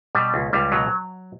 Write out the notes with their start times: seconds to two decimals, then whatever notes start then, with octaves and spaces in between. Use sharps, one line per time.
0.15 B2 G3
0.34 C#2
0.53 C#2 G3
0.72 B2 F#3